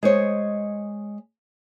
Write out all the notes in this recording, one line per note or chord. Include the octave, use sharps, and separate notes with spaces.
G#3 C5 C#5 D#5